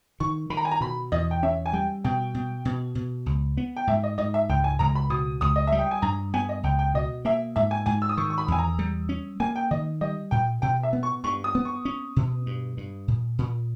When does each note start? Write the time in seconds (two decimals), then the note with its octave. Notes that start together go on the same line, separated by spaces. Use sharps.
0.20 D#3 C#6
0.50 D#3 B5
0.57 A#5
0.65 G#5
0.71 A#5
0.81 B2 B5
1.12 E2 D#5
1.31 G5
1.43 C#4 E5
1.66 G#5
1.73 G3 G5
2.04 B2 G5
2.34 B2
2.65 B2
2.95 B2
3.26 C#2
3.57 B3
3.77 G5
3.87 G#2 E5
4.04 D#5
4.18 G#2 D#5
4.34 E5
4.49 C#2 G5
4.64 G#5
4.79 C#2 A#5
4.95 B5
5.10 B2 D#6
5.41 C#2 D#6
5.56 D#5
5.67 G3 E5
5.79 G5
5.91 G#5
6.02 G2 A#5
6.34 B3 G#5
6.49 D#5
6.63 C#2 G5
6.79 G5
6.94 B2 D#5
7.25 A#3 E5
7.56 G#2 E5
7.71 G#5
7.86 G#2 G#5
8.02 E6
8.09 D#6
8.17 D#3 C#6
8.30 C#6
8.38 B5
8.48 E2 G#5
8.59 A#5
8.79 G3
9.09 C#4
9.40 A#3 G#5
9.56 G5
9.71 D#3 D#5
10.01 G3 D#5
10.31 A#2 G5
10.62 B2 G5
10.83 E5
10.93 B3
11.03 C#6
11.24 G2 C#6
11.44 D#6
11.55 B3
11.65 C#6
11.85 C#4
12.16 B2
12.46 G2
12.77 G2
13.08 A#2
13.38 A#2